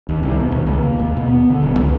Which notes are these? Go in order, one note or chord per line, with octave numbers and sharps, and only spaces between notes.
D#2
C2
B2
D#2
C#2
A#3
D#2
B2
B3
D3
D#1
C#2